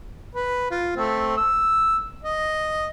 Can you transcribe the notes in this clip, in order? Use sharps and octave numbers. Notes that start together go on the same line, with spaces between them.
B4
F4
A3 C4
E6
D#5